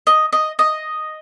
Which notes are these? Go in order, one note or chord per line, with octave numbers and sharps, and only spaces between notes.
D#5
D#5
D#5